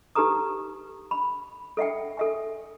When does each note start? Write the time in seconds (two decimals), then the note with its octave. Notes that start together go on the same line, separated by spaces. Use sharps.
0.15 D#4 G4 A4 B4 A#5 D#6
1.11 B5
1.77 A4 E5 F#5 G5
2.17 A4 E5 G#5